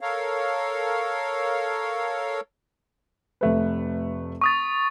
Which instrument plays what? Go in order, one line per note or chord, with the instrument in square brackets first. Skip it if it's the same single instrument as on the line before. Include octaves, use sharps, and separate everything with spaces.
[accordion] A4 A#4 C#5 F5
[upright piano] F1 A3 B4
[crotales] C#6 D#6 A6